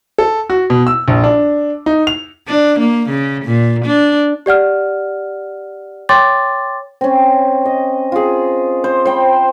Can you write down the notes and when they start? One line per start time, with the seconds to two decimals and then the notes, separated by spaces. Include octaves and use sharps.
0.18 A4
0.50 F#4
0.70 B2
0.87 E6
1.08 A#1
1.24 D4
1.86 D#4
2.07 F7
2.48 D4
2.79 A#3
3.10 C#3
3.45 A#2
3.85 D4
4.46 G4 D5 F#5 F6
6.09 C#5 G5 C6 D6 A6
7.01 C4 C#4
7.66 D#5
8.12 F4 G#4
8.84 C5
9.06 C5 G5 B5